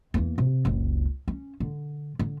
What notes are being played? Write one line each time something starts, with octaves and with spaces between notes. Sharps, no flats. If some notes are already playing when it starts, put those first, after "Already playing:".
E2 A#3
C3
F#1 C#2
C#4
D3
D3